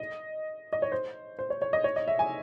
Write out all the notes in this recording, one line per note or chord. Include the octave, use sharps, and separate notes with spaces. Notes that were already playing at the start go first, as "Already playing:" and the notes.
Already playing: D#5
D#5
C#5
C5
C5
C#5
C#5
D#5
C#5
D#5
E5
G#5